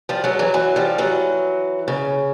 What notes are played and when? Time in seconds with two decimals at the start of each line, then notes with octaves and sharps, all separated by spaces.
0.09 F3 G3
0.24 F#3 G#3
0.39 E3 F#3
0.54 E3 F#3
0.76 F3 G3
0.98 E3 F#3
1.88 C#3